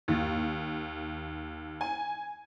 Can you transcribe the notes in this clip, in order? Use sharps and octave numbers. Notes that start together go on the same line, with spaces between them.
D#2
G#5